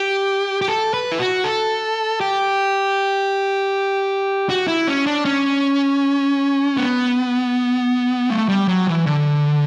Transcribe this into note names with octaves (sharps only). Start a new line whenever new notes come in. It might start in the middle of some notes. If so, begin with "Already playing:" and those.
Already playing: G4
G4
A4
B4
E4
F#4
A4
G4
F#4
E4
C#4
D4
C#4
B3
A3
G3
F#3
E3
D3